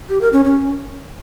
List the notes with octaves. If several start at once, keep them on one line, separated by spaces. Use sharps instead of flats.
G4
A#4
C#4
C#4